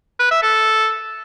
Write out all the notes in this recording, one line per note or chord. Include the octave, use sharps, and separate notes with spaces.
B4
E5
A4